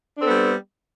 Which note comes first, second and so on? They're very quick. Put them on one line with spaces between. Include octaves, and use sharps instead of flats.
D4 C4 A4 B3 G3